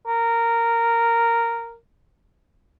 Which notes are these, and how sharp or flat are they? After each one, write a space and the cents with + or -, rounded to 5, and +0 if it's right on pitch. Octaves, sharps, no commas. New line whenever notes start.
A#4 -10